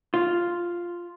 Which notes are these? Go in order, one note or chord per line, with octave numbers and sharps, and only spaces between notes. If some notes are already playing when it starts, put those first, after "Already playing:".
F4